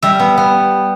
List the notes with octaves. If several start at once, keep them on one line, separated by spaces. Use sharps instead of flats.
G3 E5
B3
B3